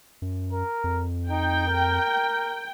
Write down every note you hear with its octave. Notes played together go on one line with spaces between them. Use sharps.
F#2
A#4
F2
D#4 G5
A#4